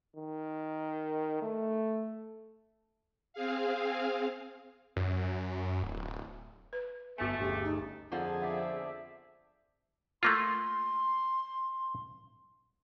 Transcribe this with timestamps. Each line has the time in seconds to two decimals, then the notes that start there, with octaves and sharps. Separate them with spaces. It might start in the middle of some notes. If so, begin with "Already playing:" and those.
0.16 D#3
1.42 A3
3.33 C4 G#4 F5
4.96 F#2
5.83 D1
6.73 B4
7.18 G1 A3 B3 F#4 G#5 E6 C#7
7.39 G1 D2 C#3 G4
7.64 D#4
8.12 F2 D3 F3 D#4 G#4 A5
8.42 B3 C5 D5 E5
10.23 A3 A#3 F4 C6